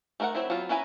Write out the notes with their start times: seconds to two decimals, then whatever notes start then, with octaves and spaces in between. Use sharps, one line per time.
0.20 A3 D#4 A#4 C5 F#5
0.35 F#3 C4 E4 C5
0.50 F#3 B3 C4 F4
0.69 C#4 E4 B4 G#5 A#5